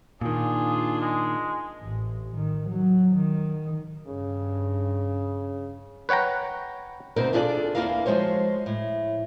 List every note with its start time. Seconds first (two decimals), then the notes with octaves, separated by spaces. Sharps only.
0.21 A#2 D#3 D4 F4 G#4
1.01 G#3
1.83 A1
2.37 D#3
2.71 F#3
3.16 D#3
4.07 G2 C#3
6.09 B4 C#5 F#5 G5 A#5
7.16 D2 B2 C4 D#4 A#4 C5
7.33 D4 E4 F4 G#4 A4 D5
7.75 E2 C3 A#3 E4 A#4 F5
8.06 F3 G#3 F#4 C5 C#5
8.66 A2